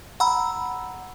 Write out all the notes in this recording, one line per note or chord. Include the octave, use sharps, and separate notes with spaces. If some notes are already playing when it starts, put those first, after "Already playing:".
F#5 A#5 B5 E6